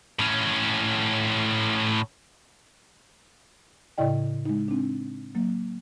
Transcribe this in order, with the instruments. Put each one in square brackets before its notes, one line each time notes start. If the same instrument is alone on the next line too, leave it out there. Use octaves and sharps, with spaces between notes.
[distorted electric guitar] A2 C#4
[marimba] A2 C#3 E4 D5 D#5 G5
G#3 D#4
C4 D4
F#3 A#3